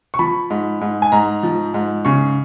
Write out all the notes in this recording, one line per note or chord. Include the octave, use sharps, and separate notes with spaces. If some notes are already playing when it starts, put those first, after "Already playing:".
C#6
F3 B5
G#2
G#2
G#5
G#2 A#5
F3
G#2
C#3 C#6